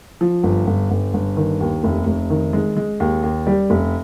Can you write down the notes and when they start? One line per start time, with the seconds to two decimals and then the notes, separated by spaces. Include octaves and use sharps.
0.21 F3
0.43 G1
0.67 G1
0.91 G1
1.14 G1
1.37 D#3
1.60 D#2
1.84 F1
2.06 F1
2.30 D#3
2.53 G#3
2.77 G#3
3.00 D#2
3.23 D#2
3.47 G3
3.70 F1